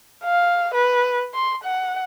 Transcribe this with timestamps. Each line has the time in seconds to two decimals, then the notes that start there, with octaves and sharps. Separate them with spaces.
0.25 F5
0.74 B4
1.34 C6
1.64 F#5